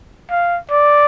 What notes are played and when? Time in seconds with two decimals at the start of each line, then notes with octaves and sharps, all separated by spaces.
0.30 F5
0.70 D5